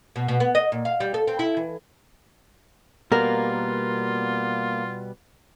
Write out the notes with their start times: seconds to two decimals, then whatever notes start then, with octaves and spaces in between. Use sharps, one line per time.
0.16 B2
0.28 B2
0.40 B3
0.55 D#5
0.72 A#2
0.85 F5
1.00 G3
1.14 A4
1.28 C4
1.39 E4
1.57 E3
3.12 B2 G3 A#3 B3 F4 A#4